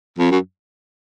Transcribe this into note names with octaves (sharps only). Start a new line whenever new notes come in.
F2
F#2